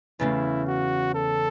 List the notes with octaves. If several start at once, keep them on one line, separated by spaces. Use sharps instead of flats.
E2 C#3 A3 E4
F#4
A4